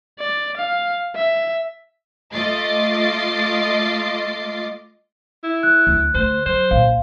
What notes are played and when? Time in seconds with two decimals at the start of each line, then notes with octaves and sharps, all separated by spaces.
0.19 D5
0.57 F5
1.15 E5
2.34 A3 F4 D#5 D6 A6 C7
5.44 E4
5.63 F#6
5.87 D2
6.15 D2 C5
6.46 F#3 C5
6.71 A#1 F5